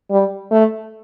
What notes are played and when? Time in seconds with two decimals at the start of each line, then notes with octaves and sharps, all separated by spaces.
0.11 G3
0.51 A3